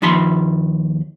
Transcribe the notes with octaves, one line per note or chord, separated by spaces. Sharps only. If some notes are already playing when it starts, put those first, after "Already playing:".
D#2 D#3 F3 B5 C6